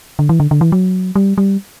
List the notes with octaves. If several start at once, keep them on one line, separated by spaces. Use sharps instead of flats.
D3
E3
D3
D3
E3
F#3
G3
G3